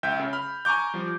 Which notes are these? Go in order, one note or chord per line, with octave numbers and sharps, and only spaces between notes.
C#2 E5 G5 G6
C#3
B5 F6
G#5 A#5 C#6 D6 G6
F3 G3